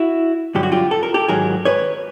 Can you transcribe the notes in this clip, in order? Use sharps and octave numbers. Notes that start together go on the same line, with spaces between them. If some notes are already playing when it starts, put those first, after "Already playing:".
Already playing: E4 F#4
G2 D3 F#3 G4
F#4
F4 G4
A4
A#4
G4 A4
G#2 D#3 F#3 G#4 A#4
B4 C#5